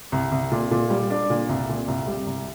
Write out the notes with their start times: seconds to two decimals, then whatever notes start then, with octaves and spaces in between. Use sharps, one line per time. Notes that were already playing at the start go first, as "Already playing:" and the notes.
0.12 C2
0.32 C2
0.52 A#2
0.71 A#2
0.90 G3
1.10 D4
1.30 A#2
1.49 C2
1.69 A#2
1.88 C2
2.07 G3
2.27 C2